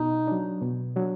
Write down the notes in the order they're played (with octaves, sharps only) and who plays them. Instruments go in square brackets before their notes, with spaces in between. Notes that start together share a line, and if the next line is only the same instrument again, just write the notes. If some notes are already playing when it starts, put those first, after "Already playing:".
Already playing: [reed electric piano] B2 [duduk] D#4
[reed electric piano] F#3 D4
B2
F#3 D4